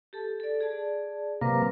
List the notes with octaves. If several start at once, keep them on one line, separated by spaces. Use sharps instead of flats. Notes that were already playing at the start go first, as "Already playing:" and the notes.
G4 A4 A5
A4 D5
G#4 D5 A5
C3 F#3 A#3 B4